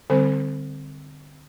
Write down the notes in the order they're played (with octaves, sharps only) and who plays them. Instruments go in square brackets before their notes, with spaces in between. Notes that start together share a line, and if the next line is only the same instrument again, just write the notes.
[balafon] D3 G3 C4 C5